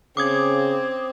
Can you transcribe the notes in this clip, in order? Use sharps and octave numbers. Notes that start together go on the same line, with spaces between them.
C#3 C4 D6 D#6 G#6